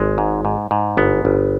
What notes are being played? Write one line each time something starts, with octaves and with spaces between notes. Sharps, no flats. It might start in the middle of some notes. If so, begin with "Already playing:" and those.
Already playing: G#1 G#3
G#2
G#2
G#2
G1 B3
G1